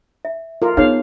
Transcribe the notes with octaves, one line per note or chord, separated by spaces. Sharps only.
E5
F4 A4 A#4
B3 D#4 G#4 C#5 F5